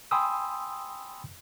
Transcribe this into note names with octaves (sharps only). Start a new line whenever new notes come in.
G5 G#5 B5 C6 D#6 E6